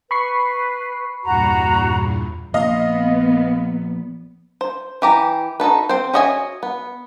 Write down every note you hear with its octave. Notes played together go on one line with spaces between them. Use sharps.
B4 B5 C#6 C7
E2 G2 A#2 F#4 A#5
F3 A#3 B3 D#5 F5
C5
E3 G4 A#5
D#4 F#4 A4 B4
C4 C5
C#4 F#4 D#5 E5 G#5
B3